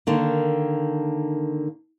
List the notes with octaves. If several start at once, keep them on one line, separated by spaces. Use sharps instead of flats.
D3 D#3 A#3